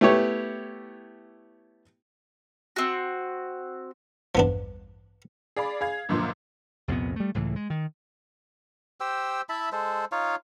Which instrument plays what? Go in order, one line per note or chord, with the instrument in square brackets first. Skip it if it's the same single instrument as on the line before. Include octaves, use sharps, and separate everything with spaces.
[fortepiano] A3 B3 E4 G4 C#5
[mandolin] C4 F#4
[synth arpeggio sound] A1 E2 G2 [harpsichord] F3 B3 D4
[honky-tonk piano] G#4 D5 F5 B5
G#4 F5 G#6
C#2 F#2 A#2 D3 F3
[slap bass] C2 F2 A#2 B3
G3 A3
C#2 A2 E3
G#3
D#3
[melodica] G4 C5 G5 E6
E4 E5 A5 B5
G#3 A4 C5
D#4 F4 C#5 F5